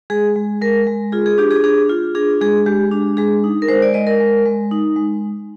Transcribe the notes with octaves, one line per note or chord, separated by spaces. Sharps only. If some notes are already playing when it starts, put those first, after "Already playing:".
G#3 G#4
G#3
G#3 A#4
G#3
F4 G#4
G#4
D4 G4
G#4
D4 G#4
F4
D4 G#4
G#3 G#4
G#3 G4
D4
G#3 G#4
D#4
A#4
G#3 C5
D5
G#3 D#5
A#4
G#3
G#3
D#4
G#3